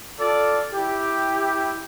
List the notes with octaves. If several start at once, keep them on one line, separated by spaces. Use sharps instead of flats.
F4 A4 D5
E4 G4